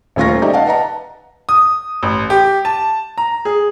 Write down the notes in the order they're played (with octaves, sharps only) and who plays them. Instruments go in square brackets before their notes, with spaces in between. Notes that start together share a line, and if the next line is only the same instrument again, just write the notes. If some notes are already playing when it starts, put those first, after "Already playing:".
[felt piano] D#1 A3 C#4 F4 C#6 A#6
D#4 G4 D5 E5 A#5
D5 D#5 F5 F#5 A5
B4 D#5 F#5 A5 A#5
[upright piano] D#6
A1
G4
A5
A#5
G#4